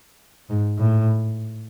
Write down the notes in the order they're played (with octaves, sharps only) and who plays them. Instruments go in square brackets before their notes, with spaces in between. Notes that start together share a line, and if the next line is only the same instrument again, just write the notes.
[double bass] G#2
A2